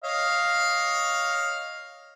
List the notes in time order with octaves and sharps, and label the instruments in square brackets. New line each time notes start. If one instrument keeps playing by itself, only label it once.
[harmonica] C#5 D#5 F5